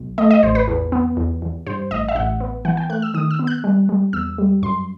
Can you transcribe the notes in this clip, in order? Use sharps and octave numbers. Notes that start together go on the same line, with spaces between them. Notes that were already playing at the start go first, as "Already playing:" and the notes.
Already playing: B1
A3 D#5
D#5
A1 C5
B4
E2
B3
E2
E2
G2 C5
A1 D#5
E5
A1 F#5
B3
E3 F#5
G5
A3 F#6
E6
D#3 D#6
E6
B3
F#6
G3
G3
E2 E6
G3
F#2 C6